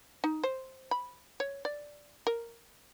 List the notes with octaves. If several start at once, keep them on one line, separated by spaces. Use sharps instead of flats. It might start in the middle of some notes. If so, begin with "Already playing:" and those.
D#4
C5
B5
C#5
D5
A#4